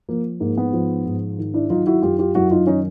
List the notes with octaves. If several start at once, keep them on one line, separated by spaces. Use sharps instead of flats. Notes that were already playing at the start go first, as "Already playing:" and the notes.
F3 A#3
G#2 A#3
B3
F3
G#2
D#3
D4 E4
F#3 D#4 F4
E4 F#4
F#2 F4 G4
F4 G4
F#2 E4 F#4
D#4 F4
D#3 C#4 D#4